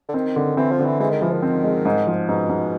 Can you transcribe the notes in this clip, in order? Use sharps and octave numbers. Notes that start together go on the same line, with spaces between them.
D3
D#3 C4
D3
E3 C4
F3
D3
E3
E3 G#3
D#3
E3 F3
D#3
C4
G#3
G#2
F3
G#2 B2
G#2